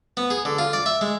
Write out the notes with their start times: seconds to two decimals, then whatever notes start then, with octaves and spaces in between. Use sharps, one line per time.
0.17 B3
0.30 G#4
0.45 D3
0.59 F4
0.73 D5
0.86 E5
1.01 G#3